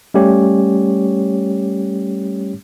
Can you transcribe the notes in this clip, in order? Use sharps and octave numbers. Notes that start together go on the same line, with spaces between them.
G3 A3 C#4 G4 C#5